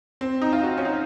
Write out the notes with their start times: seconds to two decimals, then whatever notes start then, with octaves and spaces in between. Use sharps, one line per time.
0.21 C4
0.42 D#4
0.53 F4
0.63 F#4
0.78 C#4
0.85 D#4